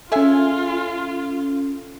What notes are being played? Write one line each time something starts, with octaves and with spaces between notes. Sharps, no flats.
C#4 F4 G#4 A4 E5 G#5